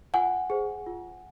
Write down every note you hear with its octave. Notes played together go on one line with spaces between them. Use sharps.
F4 F#5 G#5
G#4 C5
F4